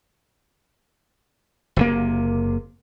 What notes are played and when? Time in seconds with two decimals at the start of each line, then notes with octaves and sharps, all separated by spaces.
1.76 F#1 C3 A#3